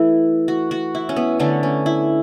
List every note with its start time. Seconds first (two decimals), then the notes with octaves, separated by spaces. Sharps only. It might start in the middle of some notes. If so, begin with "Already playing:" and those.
Already playing: E3 A3 E4
0.48 F#4
0.71 F#4
0.95 E4
1.09 C#4
1.16 B3
1.39 D3 A3 C#4
1.63 C#4
1.86 E4